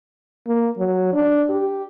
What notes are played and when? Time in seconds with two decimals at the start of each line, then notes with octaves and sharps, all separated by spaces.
0.47 A#3
0.78 F#3
1.13 D4
1.49 G4